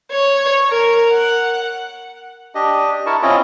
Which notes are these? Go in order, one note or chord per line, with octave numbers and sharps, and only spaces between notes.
C#5
A#4
F#5
D4 G4 D#5
E4 A#4 A5 C#6
C4 C#4 E4 F4 D#5